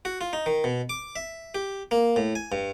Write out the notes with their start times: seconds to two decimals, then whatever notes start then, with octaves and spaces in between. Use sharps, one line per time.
0.05 F#4
0.21 F4
0.33 D#4
0.46 D#3
0.64 B2
0.89 D6
1.16 E5
1.55 G4
1.91 A#3
2.16 A2
2.35 G#5
2.52 G2